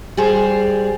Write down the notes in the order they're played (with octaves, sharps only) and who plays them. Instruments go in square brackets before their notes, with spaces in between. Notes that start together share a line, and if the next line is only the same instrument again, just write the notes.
[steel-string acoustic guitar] G3 G#4 C5